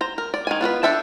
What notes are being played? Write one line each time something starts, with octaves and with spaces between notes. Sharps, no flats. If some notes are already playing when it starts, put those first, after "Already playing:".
C5 A#5
A#4
D5
D#3 E3 G#5
B3 F4 F#4 B4
D4 A4 E5 G5 A5